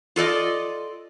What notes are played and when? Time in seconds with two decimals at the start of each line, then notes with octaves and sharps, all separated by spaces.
0.16 F4 A4 D5 D#5